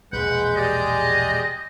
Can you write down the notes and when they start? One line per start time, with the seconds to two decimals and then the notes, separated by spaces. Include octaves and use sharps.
0.13 E1 A#1 G#3 B4 F#5 G6
0.56 G4 G#4 D5 D#5